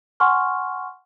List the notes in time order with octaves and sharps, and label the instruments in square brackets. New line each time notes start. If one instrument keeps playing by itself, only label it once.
[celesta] F#5 G#5 C6 C#6 F6